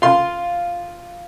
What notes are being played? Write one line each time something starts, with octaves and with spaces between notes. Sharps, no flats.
F4 C6